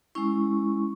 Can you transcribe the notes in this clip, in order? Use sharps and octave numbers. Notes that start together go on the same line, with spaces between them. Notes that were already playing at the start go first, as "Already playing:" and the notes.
G#3 C#4 E4 C#6